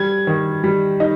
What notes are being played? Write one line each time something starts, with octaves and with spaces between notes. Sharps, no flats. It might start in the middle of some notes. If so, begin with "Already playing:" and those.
Already playing: G3 G#6
D#3
G3
D#4